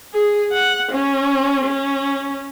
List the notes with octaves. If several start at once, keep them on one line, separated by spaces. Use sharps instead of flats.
G#4
F#5
C#4
C#4